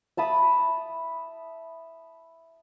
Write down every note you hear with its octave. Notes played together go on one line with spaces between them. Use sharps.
E5 A5 B5 D#6